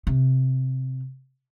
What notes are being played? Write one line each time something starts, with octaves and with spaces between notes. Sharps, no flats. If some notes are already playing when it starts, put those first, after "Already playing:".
C3